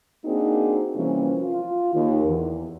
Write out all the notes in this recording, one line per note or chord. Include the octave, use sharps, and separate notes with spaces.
A#3 C4 D4 D#4 F#4 G#4
C3 E3 F3 G3 A#3 C#4
F4
D#2
E2